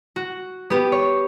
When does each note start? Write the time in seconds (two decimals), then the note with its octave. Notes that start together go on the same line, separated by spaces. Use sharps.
0.16 F#4
0.70 B3 G4
0.92 C#5